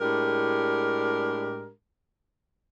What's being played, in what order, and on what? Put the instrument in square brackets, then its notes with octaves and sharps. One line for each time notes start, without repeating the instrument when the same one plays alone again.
[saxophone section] A2 G#3 D4 G4 A#4